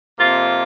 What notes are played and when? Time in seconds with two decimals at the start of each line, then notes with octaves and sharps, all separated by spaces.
0.18 F2 C3 A#3 F4